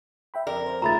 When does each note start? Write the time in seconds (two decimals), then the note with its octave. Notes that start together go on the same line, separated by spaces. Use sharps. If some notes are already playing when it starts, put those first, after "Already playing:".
0.34 E5 G5 B5
0.47 F2 A#4 D5
0.66 C5
0.82 D#2 C#3 A3 F4 A#5 B5 A6